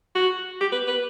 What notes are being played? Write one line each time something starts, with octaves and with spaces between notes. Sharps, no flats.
F#4
G4
B4
B4